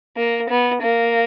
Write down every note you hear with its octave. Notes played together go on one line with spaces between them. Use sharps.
A#3
B3
A#3